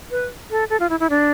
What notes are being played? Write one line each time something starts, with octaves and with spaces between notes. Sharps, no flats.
B4
A4
A4
F4
E4
E4
D4